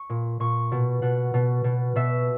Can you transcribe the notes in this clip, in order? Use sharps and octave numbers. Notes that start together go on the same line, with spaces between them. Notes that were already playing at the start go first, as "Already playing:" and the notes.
Already playing: C#6
A#2
A#2 C#6
B2
B2 F#5
B2
B2
B2 E5